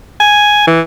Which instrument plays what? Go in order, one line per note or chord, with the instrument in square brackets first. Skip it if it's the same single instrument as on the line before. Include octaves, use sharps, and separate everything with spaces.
[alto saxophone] G#5
E3